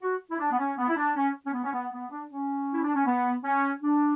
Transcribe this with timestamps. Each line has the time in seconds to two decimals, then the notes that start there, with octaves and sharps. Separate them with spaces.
0.01 F#4
0.31 E4
0.39 D4
0.51 B3
0.58 C#4
0.77 B3
0.88 E4
0.96 D4
1.15 C#4
1.46 C#4
1.53 B3
1.64 C#4
1.73 B3
1.92 B3
2.10 D4
2.29 C#4
2.72 E4
2.83 D4
2.94 C#4
3.06 B3
3.44 C#4
3.82 D4